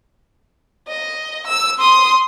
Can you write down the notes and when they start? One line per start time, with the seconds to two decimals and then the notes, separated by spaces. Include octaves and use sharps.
0.88 D#5
1.47 E6
1.78 C6 D#6